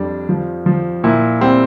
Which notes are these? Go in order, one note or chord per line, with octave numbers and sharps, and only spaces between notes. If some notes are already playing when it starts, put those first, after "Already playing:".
Already playing: F2 G3 D4
F3
F3
A#2 E4
G3 C4